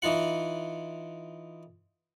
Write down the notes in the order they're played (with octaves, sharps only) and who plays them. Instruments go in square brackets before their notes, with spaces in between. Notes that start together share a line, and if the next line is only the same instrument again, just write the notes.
[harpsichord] E3 D#4 F4 F#5